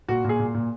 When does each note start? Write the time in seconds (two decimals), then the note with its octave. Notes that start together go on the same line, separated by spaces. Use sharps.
0.08 A#2 F#4
0.24 A#2 G#4
0.39 A#2
0.54 A#2